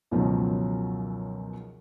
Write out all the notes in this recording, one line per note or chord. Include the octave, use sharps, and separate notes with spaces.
C#2 F#2 B2 D#3 F3 F#3